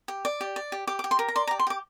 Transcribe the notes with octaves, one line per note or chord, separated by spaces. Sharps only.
G4
D5
G4
D5
G4
G4 D6
D6
G4
C6
A#4
A#5
D5 C6
A#5
G4
C6
G4 D6